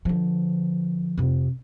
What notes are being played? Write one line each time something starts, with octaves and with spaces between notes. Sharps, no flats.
D3 F3
F2 C3